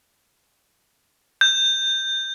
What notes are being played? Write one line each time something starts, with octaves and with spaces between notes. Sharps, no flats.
G6